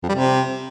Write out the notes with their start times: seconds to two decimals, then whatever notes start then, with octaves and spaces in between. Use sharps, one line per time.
0.03 F2
0.09 G3
0.15 C3